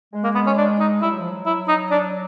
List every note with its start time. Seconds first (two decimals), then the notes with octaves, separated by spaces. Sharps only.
0.13 G#3
0.24 A#3
0.35 B3
0.46 C#4
0.57 D4
0.80 D#4
1.02 G3 E4
1.11 F#3
1.20 F3
1.30 F#3
1.46 E4
1.68 D#4
1.91 D4